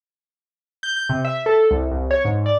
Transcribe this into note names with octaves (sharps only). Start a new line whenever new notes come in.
G6
G6
C3
E5
A4
C2
C2
C#5
G#2
D5